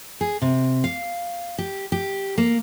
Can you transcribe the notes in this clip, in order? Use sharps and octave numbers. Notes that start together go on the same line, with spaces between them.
G#4
C3
F5
G4
G4
A#3